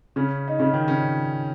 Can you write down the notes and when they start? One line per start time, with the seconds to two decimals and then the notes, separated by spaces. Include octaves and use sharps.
0.16 C#3 C#4
0.48 D#4
0.59 C#3 C#4
0.73 D#3 D#4
0.88 C#3 C#4